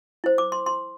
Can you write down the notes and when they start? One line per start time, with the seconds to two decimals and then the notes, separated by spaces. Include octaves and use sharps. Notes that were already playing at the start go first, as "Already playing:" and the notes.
0.24 E4 C5
0.38 D6
0.52 C6
0.66 C6